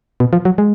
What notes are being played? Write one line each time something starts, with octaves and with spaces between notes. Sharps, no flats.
B2
F3
F#3
G#3